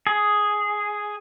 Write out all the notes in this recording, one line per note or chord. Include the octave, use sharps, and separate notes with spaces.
G#4